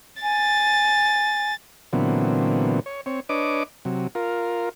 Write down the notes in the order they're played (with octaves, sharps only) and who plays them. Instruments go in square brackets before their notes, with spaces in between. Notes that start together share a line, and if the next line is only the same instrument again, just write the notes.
[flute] G#5 [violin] A6
[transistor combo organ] A#2 D3 E3 F#3 B3 C4
C#5
C4 C#5
D4 B4 C#5 D#5 D6
C3 F#3
F4 A#4